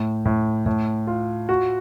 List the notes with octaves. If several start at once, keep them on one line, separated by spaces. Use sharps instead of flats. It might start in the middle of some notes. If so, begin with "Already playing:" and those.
Already playing: A2
A2
A2
F4
F#4